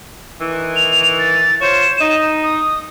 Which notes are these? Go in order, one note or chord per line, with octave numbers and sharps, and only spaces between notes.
D#3 E3
F7
A6
F4 C5 C#5 E7
D#4
D#6